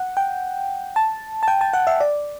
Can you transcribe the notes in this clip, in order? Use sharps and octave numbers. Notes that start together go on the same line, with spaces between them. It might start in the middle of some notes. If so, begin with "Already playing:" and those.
Already playing: F#5
G5
A5
A5
G5
A5
F#5
E5
D5